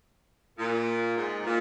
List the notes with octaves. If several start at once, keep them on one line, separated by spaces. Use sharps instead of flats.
A#2
G#2
A#2